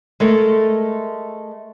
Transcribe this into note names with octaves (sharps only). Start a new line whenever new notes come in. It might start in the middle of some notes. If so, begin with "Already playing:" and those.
G#3 A3 A4 A#4